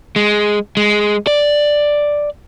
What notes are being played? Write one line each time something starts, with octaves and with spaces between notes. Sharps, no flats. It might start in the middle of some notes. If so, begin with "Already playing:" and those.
G#3
G#3
D5